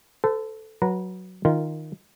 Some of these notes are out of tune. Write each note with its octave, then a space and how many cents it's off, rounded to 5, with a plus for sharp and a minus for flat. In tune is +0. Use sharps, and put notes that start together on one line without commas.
A4 +0 C5 -45
F#3 +0 B4 -25 A#5 -5
D#3 +0 F4 -10 A#4 -20